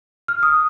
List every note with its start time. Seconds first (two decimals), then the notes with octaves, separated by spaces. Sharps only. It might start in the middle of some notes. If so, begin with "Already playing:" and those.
0.28 F6
0.43 D#6